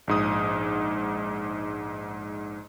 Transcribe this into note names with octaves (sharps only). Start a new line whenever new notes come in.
A#1 G#2 D#6